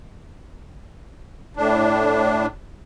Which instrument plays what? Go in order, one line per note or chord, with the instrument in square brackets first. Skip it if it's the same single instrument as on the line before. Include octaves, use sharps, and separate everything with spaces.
[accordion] A2 D4